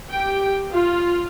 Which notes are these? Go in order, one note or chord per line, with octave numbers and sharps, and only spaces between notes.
G4 G5
F4